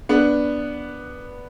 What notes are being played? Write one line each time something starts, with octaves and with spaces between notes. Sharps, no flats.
B3 D4